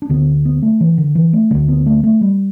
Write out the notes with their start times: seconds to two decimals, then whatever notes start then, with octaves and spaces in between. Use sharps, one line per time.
0.02 D4
0.09 D2 D3 B3
0.45 B3
0.62 A3
0.81 E3
0.98 D3
1.15 E3
1.33 A3
1.51 D3 G3
1.54 D2
1.68 B3
1.86 A3
2.03 A3
2.21 G3